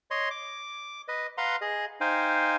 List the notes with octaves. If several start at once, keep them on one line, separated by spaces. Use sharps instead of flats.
C#5 D#5 C6
D6
B4 D#5
B4 F5 F#5 A#5 C6
G#4 D#5
D#4 C5 F5 G5 G#5